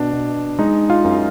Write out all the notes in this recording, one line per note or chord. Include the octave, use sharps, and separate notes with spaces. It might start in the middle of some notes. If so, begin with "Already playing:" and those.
Already playing: B2 D4
B2
G#3 D#4 D#5
F4 F5
F#2